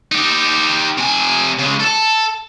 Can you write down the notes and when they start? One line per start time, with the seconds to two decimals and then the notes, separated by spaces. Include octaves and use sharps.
0.12 D#4 G4
0.98 C3 G#5
1.59 C#3 G#3
1.80 A4 A5